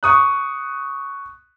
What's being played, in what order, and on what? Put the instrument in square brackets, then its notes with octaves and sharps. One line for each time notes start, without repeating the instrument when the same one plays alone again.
[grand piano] C#6 D#6 F#6